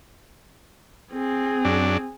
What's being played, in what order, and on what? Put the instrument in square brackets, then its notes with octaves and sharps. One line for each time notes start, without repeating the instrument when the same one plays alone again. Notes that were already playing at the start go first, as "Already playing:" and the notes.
[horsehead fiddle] C4 G#4
[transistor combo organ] F#2 D4